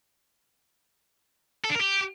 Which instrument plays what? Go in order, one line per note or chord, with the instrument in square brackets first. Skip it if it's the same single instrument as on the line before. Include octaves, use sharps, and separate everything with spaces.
[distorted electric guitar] A4
D4
A#4
G4